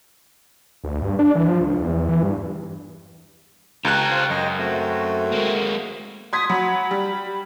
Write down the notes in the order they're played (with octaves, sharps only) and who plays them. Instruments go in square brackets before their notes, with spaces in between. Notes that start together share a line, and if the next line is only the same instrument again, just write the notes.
[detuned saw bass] D2
G2
D4
E3
F3
C#2
E2
E3
G2
[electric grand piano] C#2 F#6 [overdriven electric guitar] G4 A4 [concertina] A#5
[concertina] C5 F5
[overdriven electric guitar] F#2 [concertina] D#5 G5
[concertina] A3 C4 F#4
[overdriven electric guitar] G#3 A#3
[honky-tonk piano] C6 G#6 B6 [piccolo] D#6
[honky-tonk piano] F#3 [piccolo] B5
[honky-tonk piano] G3